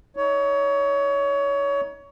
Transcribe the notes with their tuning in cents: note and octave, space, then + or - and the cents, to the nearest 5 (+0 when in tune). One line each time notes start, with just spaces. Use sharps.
D#4 +25 C#5 +25